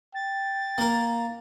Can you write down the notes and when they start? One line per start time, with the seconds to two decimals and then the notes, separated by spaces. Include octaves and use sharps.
0.14 G5 A6
0.78 A#3 A#4